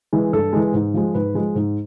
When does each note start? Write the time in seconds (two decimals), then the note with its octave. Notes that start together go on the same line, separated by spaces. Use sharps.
0.13 E3 G#3
0.33 G2 A4
0.53 E3 G#3
0.74 G#2
0.94 F3 G#3
1.14 G#2 B4
1.34 F3 G#3
1.55 G#2